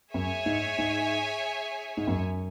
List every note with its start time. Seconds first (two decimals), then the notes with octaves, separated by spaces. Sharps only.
0.14 F#2 G#4 C#5 E5 G#5
0.46 G#2
0.78 G#2
1.97 G#2
2.07 F#2